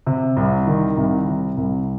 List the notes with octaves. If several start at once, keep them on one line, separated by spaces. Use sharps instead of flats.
C3
C2
D#3
C2
C3
C2